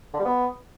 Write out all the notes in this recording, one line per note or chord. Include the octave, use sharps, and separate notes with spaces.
D3
G3
B3